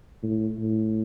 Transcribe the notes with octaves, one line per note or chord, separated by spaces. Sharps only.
A2
A2